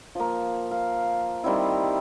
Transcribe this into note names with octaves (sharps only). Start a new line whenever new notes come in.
F3 A#3
F5
D#3 G3 C4 E4